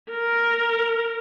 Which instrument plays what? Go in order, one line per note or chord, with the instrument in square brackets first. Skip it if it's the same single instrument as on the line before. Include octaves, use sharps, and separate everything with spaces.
[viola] A#4